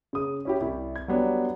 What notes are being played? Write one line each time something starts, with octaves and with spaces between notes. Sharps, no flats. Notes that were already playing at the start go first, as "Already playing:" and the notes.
C#3 D#6
C#4 E4 G4
C2 E4
G#6
F#3 G3 B3 D4